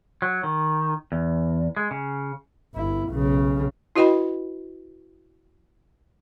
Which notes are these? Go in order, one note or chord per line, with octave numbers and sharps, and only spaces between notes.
F#3
D#3
E2
G#3
C#3
G1 E4
B1 C#3
E4 F#4 B4 D#5 G5 B5